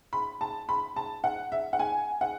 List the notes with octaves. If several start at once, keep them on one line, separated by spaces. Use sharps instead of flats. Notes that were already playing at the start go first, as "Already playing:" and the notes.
B5
A5
B5
A5
F#5
E5
F#5
G#5
F#5